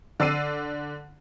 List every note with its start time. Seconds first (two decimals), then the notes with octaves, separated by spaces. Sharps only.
0.20 D3 D5 E6 C7 D#7